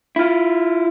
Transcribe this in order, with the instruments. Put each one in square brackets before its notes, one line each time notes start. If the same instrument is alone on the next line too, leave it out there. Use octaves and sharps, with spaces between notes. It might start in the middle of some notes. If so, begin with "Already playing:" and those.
[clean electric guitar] E4 F4